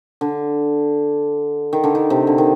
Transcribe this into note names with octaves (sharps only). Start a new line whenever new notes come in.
D3
D#3
D3
D#3
C3
D3
D#3